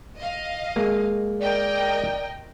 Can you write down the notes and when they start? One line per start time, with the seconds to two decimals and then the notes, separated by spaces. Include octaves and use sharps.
0.18 D#5 F5
0.76 G#3 A#3
1.40 A#4 D5 D#5 G5